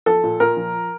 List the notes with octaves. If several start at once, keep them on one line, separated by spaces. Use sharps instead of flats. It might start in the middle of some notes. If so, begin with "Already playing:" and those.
F3 A4
A#2
A#2 A#4
F3